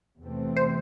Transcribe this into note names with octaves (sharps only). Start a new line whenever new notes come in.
E2 C3 E3 A3 C4
C5